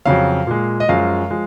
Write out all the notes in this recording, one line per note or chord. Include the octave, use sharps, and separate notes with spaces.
F2 C#3 F#3 F5
A#2 G#3
D#5
F#2 F3 G#3 F5
F3 G#3